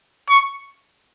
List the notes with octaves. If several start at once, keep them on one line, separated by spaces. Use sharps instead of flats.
C#6